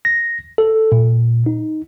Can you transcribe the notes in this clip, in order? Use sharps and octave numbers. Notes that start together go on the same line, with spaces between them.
A#6
A4
A#2
D#4